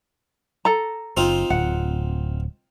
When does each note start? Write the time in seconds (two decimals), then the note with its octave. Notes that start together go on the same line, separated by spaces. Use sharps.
0.65 A4 A#5
1.17 F#1 C4 D#4 F4
1.50 D1 F#5